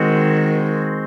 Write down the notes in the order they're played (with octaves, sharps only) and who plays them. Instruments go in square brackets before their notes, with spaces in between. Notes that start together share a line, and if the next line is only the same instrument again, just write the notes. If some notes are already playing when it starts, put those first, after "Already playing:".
Already playing: [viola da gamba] D#3 [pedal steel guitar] G#3 C4 F#4